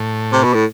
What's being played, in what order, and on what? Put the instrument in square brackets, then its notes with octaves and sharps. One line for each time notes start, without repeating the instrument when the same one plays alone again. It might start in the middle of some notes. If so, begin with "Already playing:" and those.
Already playing: [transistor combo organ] A2
[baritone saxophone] C3
B2
A2